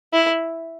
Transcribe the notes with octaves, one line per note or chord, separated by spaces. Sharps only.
E4